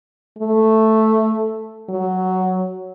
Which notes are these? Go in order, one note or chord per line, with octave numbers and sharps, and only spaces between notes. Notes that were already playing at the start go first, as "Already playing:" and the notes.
A3
F#3